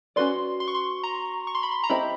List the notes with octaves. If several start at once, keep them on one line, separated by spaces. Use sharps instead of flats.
C#4 F#4 B4 D5 C6
C6
C#6
C6
A#5
C#6
C6
B5
C6
A#5
C4 E4 G4 C5 D#5 B5